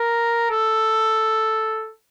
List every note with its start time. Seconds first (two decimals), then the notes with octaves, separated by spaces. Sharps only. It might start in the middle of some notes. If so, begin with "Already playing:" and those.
Already playing: A#4
0.51 A4